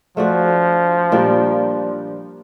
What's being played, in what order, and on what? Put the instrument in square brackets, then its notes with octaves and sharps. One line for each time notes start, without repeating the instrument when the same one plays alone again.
[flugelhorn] F3 [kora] A3 D4 F#4
[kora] A#2 G3 A#3 D4